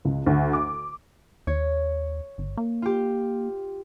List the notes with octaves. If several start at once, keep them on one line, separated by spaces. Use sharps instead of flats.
C#2
D2
D6
D#2 C#5
G1
A#3
F4 G4